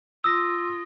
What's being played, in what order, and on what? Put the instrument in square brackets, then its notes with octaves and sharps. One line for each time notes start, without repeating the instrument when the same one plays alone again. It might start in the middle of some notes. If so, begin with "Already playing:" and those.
[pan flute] F4 [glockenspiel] D#6 A#6 [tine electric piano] E6